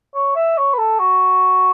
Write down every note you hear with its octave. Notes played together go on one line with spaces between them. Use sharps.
C#5
E5
C#5
B4
A4
F#4